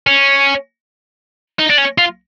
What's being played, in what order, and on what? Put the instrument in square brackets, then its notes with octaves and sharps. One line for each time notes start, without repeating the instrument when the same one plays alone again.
[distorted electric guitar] C#4
D#4
D4
C#4
F4